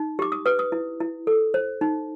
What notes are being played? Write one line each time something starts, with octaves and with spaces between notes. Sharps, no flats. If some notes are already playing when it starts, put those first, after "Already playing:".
Already playing: D#4
G4 D6
D#6
B4 D#6
D#6
E4
E4
A4
C5
D#4